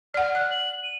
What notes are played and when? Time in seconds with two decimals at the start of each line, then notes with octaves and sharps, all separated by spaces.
0.14 D5 F#5 F6
0.35 D5 F#6
0.51 F#7
0.83 D#7